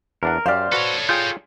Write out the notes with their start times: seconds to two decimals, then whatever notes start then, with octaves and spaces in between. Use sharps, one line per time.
0.23 E2 D4 A#4 F#5
0.46 F#2 G4 C5 D5 F5 F6
0.72 F#4 A4 B4 C#5
1.09 F4 G#4 G5 G6